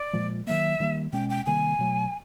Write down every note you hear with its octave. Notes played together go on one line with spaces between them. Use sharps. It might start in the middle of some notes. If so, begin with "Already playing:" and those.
Already playing: D5
A#2 F3 G#3
D#3 F#3 A#3 E5
D#3 G3 A#3
B2 G#3 C#4 G5
G5
C3 D#3 G3 A#3 G#5
B2 F#3 A3